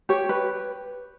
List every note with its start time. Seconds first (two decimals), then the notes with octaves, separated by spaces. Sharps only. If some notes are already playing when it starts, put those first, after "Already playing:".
0.09 G4 C#5
0.29 B4